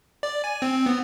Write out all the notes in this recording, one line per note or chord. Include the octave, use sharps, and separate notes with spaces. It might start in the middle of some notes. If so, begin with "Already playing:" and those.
D5
G#5
C4
B3